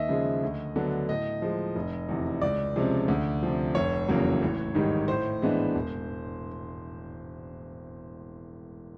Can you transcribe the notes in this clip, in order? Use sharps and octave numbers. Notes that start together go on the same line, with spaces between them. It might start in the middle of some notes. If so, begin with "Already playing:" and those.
Already playing: D#2 D#5 E5
C#3 F3 G#3
D2
D3 F#3 B3 D4
A2 D#5
F3 G#3
F1
E2 C3
C#2 D5
C3 F3 G#3 C#4
D2
C3 F3
F1 C#5
E2 C#3 F#3 A#3
A1
G#2 D#3 G3
A2 C5
E3 G#3 B3 D4
E1